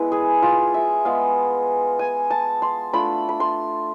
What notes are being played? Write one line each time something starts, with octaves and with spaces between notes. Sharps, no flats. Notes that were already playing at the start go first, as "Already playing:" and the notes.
Already playing: G#3 B3 E4 B4
G#4
F4
E5
G#3 B3 F4 F5
G#5
A5
C6
A3 D4 F4 B5
B5
C6